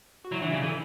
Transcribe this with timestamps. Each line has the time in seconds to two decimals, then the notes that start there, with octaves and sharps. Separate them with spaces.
0.24 F#4
0.32 F#3 E4
0.42 E3 D4
0.52 C#3 E4
0.62 E3 A4